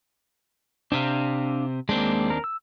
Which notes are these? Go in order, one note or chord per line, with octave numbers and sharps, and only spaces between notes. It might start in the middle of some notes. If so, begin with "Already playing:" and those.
C3 C4 D4 F5
D#2 G#3 A#3 C4 D4
A#4
E6